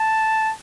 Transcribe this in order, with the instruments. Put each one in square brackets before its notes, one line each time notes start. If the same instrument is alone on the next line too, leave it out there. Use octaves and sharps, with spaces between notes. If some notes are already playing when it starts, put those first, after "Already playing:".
Already playing: [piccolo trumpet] A5